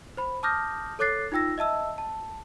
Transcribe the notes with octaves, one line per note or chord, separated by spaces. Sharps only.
C5 B5
A5 D6 D#6 F6 G6 A#6
A4 C#5 D6 F#6 A6 C7
D#4 F4 G5 E6 A#6
D#5 E5 A5 E6
A5